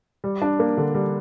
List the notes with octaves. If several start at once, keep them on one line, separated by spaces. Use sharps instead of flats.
G3
D4
A#3
D3
G3